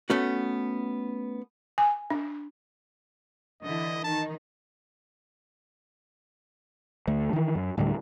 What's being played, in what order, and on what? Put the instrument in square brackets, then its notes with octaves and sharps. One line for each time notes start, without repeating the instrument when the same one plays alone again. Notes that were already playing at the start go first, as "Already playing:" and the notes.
[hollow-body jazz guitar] A3 B3 C#4 F#4
[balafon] G#5
D4
[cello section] D3 E3 E4 [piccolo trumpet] D#5
[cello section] D#3 D#4 [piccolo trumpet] A5
[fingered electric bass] D2 A3
D#3 E3
F#2
D1 A2 D3 G3